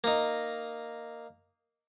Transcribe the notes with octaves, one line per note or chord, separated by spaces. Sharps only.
A#3 D#4